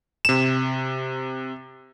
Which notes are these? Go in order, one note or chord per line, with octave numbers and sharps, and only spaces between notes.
C3 E7